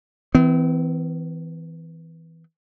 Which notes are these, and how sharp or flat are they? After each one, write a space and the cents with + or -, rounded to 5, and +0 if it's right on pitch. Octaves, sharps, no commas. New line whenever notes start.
E3 -15 C4 -45